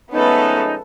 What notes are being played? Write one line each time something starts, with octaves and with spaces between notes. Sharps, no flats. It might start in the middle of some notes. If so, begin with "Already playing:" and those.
F3 G#3 A3 B3 C#4 D#4 A4 B4